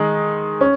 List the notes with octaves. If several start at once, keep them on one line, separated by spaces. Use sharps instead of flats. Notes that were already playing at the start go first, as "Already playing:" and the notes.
Already playing: D#3 G#3 D#4 G#4
C#4